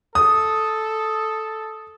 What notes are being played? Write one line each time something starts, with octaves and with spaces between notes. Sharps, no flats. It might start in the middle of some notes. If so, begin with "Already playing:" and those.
A4 D#6